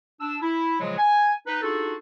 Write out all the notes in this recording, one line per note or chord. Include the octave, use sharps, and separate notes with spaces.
D4 E6
E4
A#2 C#3 F3 F#3 G#3
G#5
D#4 B4
D4 D#4 F4 F#4 G#4 A4